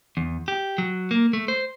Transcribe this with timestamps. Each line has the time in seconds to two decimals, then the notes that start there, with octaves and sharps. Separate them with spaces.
0.17 E2
0.48 G4
0.78 F#3
1.11 A#3
1.33 A3
1.48 C5